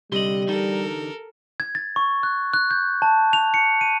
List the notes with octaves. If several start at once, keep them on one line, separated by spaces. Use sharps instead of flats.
C2 D3 G3 G4 D#5 C6 F#7
D3 E3 D#4 A4 A#4
G#6
A6
C#6
F#6
F#6
G6
A5
F7
C#7
D#7